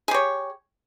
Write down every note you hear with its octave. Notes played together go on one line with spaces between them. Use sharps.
G4 G#4 C#5